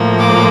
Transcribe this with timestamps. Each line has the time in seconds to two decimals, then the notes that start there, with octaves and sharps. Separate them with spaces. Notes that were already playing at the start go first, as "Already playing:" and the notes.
Already playing: A2 F3 A#3
0.18 D6